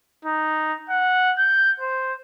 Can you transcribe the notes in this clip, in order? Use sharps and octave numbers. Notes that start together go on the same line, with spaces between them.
D#4
F#5
G6
C5